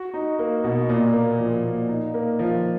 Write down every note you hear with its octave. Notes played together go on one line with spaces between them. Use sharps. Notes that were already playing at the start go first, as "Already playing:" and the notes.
Already playing: F#4
D#4
A#3
B2
A#2
A#3
F3
A#2
D#4
A#3
F3